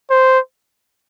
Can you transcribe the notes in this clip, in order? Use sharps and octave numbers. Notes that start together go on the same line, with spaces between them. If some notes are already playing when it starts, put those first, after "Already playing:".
C5